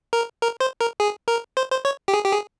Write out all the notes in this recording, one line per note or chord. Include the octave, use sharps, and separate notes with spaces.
A#4
A#4
C5
A#4
G#4
A#4
C5
C5
C#5
G4
G#4
G4
G#4